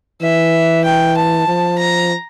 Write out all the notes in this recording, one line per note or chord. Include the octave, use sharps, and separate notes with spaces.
E3 E5
G5
A5
F3
A#5